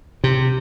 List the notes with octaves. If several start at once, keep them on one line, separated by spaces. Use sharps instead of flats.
C3